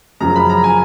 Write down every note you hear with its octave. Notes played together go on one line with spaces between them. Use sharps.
F#1 F#2 C#3 F3 A#5
B5
A#5
G#5